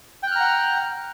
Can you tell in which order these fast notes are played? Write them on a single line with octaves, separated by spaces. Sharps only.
G5 F#6 F6 A#5 F#5